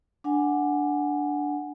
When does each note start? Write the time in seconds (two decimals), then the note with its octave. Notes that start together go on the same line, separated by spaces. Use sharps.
0.24 D4 F#5 G#5